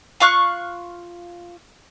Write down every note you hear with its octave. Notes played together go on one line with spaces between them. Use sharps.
F4 F5 C#6 F#6